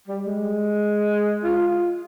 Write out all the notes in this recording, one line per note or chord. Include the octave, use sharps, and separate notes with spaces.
G3
G#3
F4